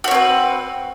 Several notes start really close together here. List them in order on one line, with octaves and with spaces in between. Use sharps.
F#4 C#5 C4 B4